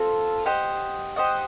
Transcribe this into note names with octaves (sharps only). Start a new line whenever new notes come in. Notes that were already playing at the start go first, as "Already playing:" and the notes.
Already playing: C4 F4 A4
G4 C5 D#5 F#5
G4 C5 D#5 F#5